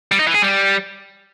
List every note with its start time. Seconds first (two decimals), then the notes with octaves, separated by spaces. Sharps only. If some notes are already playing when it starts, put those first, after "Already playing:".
0.12 G3
0.19 D#4
0.27 E3
0.35 G#4
0.42 G3